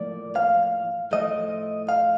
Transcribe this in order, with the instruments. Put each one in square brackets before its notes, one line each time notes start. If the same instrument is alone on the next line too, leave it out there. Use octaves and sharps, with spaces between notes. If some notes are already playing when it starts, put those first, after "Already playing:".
Already playing: [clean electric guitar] A2 F3 A#3 D5
F5
A2 F3 A3 D#5
F5